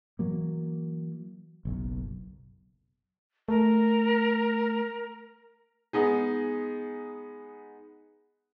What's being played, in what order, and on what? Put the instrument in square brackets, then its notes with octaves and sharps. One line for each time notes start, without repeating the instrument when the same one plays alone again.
[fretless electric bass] E3 F#3 A#3
F#1 B1
[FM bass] A3 [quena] A#4
[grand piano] G#3 B3 D#4 G#4